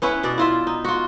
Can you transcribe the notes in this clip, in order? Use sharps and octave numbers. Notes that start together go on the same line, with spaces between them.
B3 C#4 E4 B4
B2 D4 D5
E4 F4 E5
D#4
F4 F#4